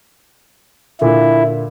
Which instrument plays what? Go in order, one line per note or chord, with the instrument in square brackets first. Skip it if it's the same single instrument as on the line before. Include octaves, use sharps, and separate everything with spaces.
[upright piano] A#2 D3 [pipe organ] E4